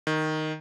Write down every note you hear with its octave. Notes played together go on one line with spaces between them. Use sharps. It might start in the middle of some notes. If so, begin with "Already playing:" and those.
D#3